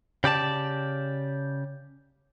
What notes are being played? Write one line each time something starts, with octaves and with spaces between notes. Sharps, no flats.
C#3 G4 D5 A5